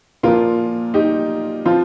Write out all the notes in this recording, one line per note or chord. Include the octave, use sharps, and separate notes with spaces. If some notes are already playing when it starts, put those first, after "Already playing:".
A#2 F3 F4 A#4
D#4 G4
F3 C4 F4